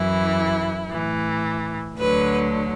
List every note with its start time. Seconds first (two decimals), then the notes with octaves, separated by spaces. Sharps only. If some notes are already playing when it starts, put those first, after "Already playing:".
Already playing: F#2 E3 E4
0.90 A2 E3
1.97 D2 D3 F#3 B4